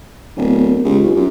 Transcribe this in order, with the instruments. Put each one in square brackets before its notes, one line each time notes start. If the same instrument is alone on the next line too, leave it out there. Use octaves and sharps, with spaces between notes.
[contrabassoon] D1 [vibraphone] B3 D4 A#4
[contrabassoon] C#2 [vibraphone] F4 G4
[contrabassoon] B1
F#2